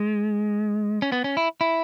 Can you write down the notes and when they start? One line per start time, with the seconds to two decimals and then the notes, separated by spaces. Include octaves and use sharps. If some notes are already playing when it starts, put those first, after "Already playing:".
Already playing: G#3
1.02 C#4
1.12 B3
1.24 C#4
1.37 E4
1.61 E4